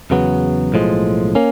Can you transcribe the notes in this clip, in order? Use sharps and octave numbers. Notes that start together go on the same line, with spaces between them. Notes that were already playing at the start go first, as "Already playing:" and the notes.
E2 C#3 F#3 B3
B1 A2 F3 G#3
A#3 C#4